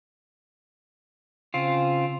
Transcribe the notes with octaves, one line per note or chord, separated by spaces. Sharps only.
C#3 C4 F4